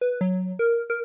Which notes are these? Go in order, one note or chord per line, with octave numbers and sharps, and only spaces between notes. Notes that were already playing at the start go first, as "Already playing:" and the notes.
B4
F#3
A#4
A#4